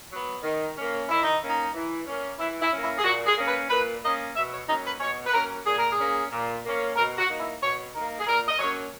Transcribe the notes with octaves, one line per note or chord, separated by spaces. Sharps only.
F#3 B3
D#3
A#3 C#4
D#3 E4
D#4
A#3 C#4
D#4
E3
A#3 C#4
E3 E4
E4
A#3 C#4
E4
G#4
A#2 F#4
G#4
A#3 C#4
B4
A#2 B4
A#3 C#4 D#5
B2 E5
C#5
F#3 A#3 C#4 D#4
B4
B2 C#5
B4
F#3 A#3 C#4 A#4
A#2 G#4
A#4
G#4
A#3 C#4
A#2
A#3 C#4
B2 A#4
F#4
A#3 D#4
E4
B2 C#5
A#3 D#4 A#4
G#4
A#2 A#4
D#5
F#3 A#3 C#4 C#5